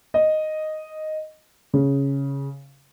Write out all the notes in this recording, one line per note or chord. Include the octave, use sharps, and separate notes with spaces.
D#5
C#3